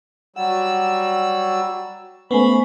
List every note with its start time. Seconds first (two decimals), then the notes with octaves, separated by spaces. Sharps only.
0.36 F#3 G3 F#5 E6
2.31 A3 B3 C#4 C5 G#5 B5